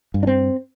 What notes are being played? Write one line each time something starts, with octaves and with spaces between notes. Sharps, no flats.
G2
D4
C4